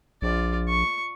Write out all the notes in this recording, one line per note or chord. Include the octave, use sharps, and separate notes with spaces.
A#1 F4 D5
C#6